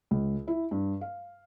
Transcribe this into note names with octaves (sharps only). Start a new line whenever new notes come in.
C#2
E4
G2
F5